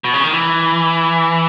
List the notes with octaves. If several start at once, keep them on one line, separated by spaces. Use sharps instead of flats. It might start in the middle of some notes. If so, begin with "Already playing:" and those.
B2
C#3
D#3
E3